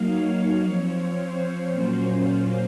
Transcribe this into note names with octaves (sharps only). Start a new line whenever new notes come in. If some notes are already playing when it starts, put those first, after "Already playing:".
Already playing: F#3 A#3 D#4 F5
C#5
F3 C4 F4
C5
A#2 F#3 A#3 C#4 F4
C5